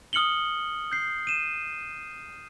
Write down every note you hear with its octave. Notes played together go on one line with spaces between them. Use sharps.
D#6 F6 C#7 F#7 G7
G6 C7
D#7 E7